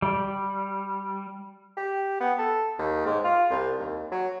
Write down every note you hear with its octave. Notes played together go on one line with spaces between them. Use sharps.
G3
G4
B3
A4
D#2
G#2
F4
C2
D#2
F#3